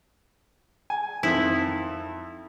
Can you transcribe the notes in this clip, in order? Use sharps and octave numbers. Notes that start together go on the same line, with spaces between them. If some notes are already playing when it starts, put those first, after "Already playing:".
G#5
F2 D#3 E4